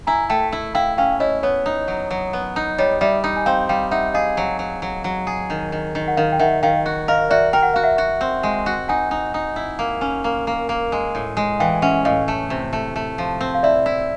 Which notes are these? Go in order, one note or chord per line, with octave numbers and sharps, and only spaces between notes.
E4 G#5 A#5
A3 G5 A5
E4
E4 F5 G5
C#4 F5 G5
E4 C#5 D#5
B3 C#5
D#4
F#3
F#3
B3
D#4
G3 C#5 D#5
G3 D5 E5
D#4
G#5
C4 F5 G5
G3 F5 G5
D#4 E5 F#5
G#4 D#5 F5
F#3
F#3
F#3
F#3
G#4
D#3
D#3
D#3
F#5
D#3 D#5 F5
G5
D#3 E5 F#5
D#3 F5 G5
F#4
A#4 D#5 F5
F#4 D5 E5
A#4 G5
F#5
F#4 F5
E5 F#5
F#4
C4
G#3
F#4
D#4 F#5 G#5
D#4
D#4
E4
A#3
C#4
A#3
A#3
A#3
G#3
A2
G#3
E3 F5 G5
C#4 E5 F#5
A2 D#5 F5
A3
C3
A3
A3
F3
C4
F5
E4 D5 E5
E4